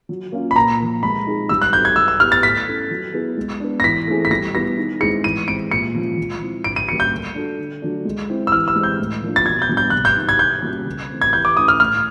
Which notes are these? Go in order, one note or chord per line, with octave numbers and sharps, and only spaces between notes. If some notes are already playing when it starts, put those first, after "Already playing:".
F#3
A#3 C#4 F4
B5
A#2 A#5
F3 A#3
G#3 B5
C4 D#4 G#4
G3 E6
F#6
C4 D#4 F#4 A4 G6
G#6
F#3 E6
E6
B3 E4 G4 F6
A6
A3 B6
C#4 E4 A4
F#3
B3 E4 G#4
G#3
B3 D4
A#6
E3 B6
A3 C4 E4 G#4
B6
G3 A#6
B3 E4 G4 A#6
D#3
G#3 C4 E4 G#4 C#7
E3 D#7
G#3 C4 D7
A#2 C#7
F3 G#3 C#4
F3
G#3 C4 E4
D3 D7
D#7
G3 A#3 C#4 F#4 C#7
G6
A3
D4 F#4 A4
D3
F#3 A3 D4
G#3
C4 E4
E6
E3 F6
E6
G#3 C4
G6
A2
F3 A#3 D4
A6
B2 G#6
G6
G3 B3 D4 G4
G6
C3 F#6
G6
D#3 F#3
G#6
B2 G6
G3 A#3 C#4 F#4
C#3
E3 A3 C4
G#6
E3 G6
D6
A3 C#4 E4 D#6
F6
A2 F6